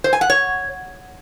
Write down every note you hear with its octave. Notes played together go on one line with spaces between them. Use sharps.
C5
G#5
F#5
C#5